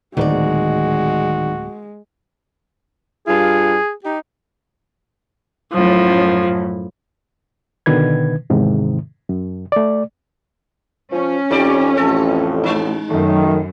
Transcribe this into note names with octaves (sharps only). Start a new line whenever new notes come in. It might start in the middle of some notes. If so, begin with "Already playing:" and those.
D1 A#2 D#3 G#3 F#4 D5
G2 F4 G#4
D#4 G4
F#2 A2 F3
B2 D3 D#3 B4 G#6
E2 G#2 C3 D#3
F#2
A3 D5
F3 C#4
F2 D#4 G4 D5
A1 A4
G#3 D#4
F#2 D#3 A3